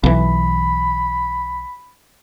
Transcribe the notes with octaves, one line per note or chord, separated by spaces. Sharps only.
B1 E3 B5